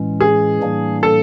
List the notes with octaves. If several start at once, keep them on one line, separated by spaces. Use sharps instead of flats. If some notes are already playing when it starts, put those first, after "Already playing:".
Already playing: A2 E3 G#3 C#4
G#4
A2 E3 G3 A#3 D4
A4